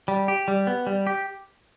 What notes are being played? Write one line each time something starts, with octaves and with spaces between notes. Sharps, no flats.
G3
G4
G3
B3
G3
G4